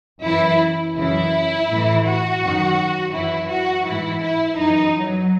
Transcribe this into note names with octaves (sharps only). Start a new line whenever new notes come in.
F#2 E3 E4
F#2 C#3 E3 E4
A2 E3
F#4
F#2 D#3
F#2 E3 E4
F#4
G#2 E3 E4
E4
F#2 E3 D#4
F#3